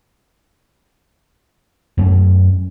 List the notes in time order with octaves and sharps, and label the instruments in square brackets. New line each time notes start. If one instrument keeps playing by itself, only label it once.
[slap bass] F#2 A3 C#4